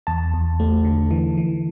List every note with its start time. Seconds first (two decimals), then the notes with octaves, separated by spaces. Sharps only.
0.07 E2 A5
0.34 E2
0.60 A3
0.84 D3
1.11 E3
1.37 E3